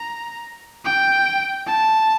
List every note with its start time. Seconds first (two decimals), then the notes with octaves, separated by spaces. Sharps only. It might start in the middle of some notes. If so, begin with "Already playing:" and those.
Already playing: A#5
0.86 G5
1.67 A5